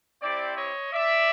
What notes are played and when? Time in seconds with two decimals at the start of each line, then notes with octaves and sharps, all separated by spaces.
0.21 C4 E4 G4 C5 D5
0.57 C#5 D#5
0.93 D5 E5